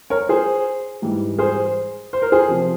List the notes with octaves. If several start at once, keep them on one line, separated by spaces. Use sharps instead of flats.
A#4 C#5
G#4 C5
G#2 E3 G3
G#4 C5
C5
A#4
G#4 C5
C3 F3